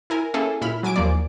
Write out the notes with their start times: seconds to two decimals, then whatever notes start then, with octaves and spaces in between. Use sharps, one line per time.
0.10 E4 A#4 G#5
0.34 A#3 C#4 E4 G#4 A4
0.61 A#2 E4 B5 F6
0.83 F#3 G#5 D6 D7
0.96 D#2 F3 A#3 D5